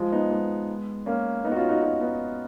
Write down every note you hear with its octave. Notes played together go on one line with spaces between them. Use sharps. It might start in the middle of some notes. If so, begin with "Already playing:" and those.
Already playing: F3 G#3
B3 D#4
G#3 B3
A#3 C#4
B3 D#4
F#4
C#4 F4
D#4 F#4
D#4 F#4
B3 D#4